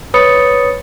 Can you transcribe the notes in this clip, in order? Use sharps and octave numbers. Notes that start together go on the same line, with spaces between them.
B4 C#5 B5 D#6 A6 C#7